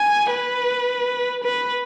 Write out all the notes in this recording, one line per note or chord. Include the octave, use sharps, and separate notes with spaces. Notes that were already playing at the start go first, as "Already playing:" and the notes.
Already playing: G#5
B4
B4